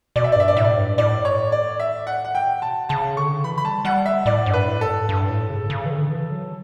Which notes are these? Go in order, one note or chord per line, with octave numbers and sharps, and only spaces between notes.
B2 D5
E5
D5
G2 E5
D5
A2 E5
D5
G2
A2 D5
C#5
D5
E5
F#5
F#5
G5
B2 A5
C#3 A5
D3 C#6
E3 B5
B5
G3 A5
G3 F#5
E5
A2 D5
G2
B4
A2
A4
G2
A2
C#3
C#3
E3
D3
E3
F#3